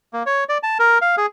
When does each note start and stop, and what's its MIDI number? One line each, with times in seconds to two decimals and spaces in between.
0.13 0.23 58
0.26 0.44 73
0.49 0.58 74
0.63 0.78 81
0.79 0.98 70
1.02 1.15 77
1.17 1.26 68